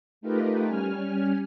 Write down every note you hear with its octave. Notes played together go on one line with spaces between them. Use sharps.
A3 D#4 F4 G4 A#4 B4
G3 C#4 G#5 F6